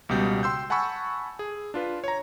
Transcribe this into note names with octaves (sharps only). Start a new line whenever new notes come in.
C#2 B2 G3 G6
G5 C6 E6 G6
F#5 G#5 A5 B5 C#6 E6
G#4
D4 F4 B4
C#5 A#5